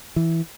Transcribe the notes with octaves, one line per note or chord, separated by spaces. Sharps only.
E3